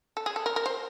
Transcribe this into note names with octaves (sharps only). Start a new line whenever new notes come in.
A4
G#4
A4
A#4
A#4
C5